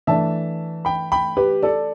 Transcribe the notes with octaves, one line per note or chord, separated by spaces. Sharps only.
E3 A3 D4 E5 A5
G5 B5
G5 B5
G4 B4
A4 D5